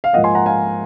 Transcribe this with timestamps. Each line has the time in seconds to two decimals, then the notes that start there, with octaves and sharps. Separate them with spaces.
0.04 F5
0.13 G#2 F3 A#3 D#5 F#5
0.24 G#5 C6
0.35 F#5 A#5
0.46 F5 G#5